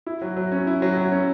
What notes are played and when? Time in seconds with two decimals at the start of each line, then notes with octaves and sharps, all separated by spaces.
0.06 E4
0.21 F#3
0.37 F#3
0.52 C#4
0.67 E4
0.82 F#3
0.97 F#3
1.12 C#4